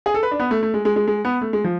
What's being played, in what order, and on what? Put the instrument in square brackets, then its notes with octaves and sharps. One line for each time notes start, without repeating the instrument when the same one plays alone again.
[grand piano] G#4
A4
B4
D4
B3
A3
A3
G#3
G#3
G#3
G#3
B3
A3
G#3
F3